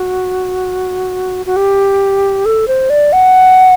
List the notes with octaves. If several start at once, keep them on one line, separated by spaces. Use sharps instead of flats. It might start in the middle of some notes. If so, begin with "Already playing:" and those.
Already playing: F#4
F#4
G4
A4
C5
D5
F#5